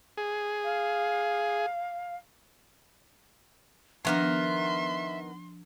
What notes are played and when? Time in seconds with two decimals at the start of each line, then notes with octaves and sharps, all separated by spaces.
0.18 G#4
0.65 F5
4.05 D#3 F3 B3 D4 A#4 E5 C6